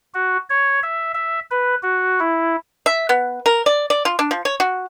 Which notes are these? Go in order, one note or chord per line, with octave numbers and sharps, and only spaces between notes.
F#4
C#5
E5
E5
B4
F#4
E4
E5
B3
A#4
D5
D5
F4
D4
F3
C#5
F#4